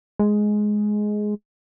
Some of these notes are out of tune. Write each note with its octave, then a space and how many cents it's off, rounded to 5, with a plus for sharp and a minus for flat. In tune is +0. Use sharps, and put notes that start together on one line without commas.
G#3 +10